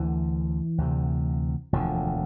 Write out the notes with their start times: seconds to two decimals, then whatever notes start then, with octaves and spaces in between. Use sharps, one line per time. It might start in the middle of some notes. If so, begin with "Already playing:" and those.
Already playing: D2 D3 E3
0.78 D2 C3
1.73 E1 D2 D3 F3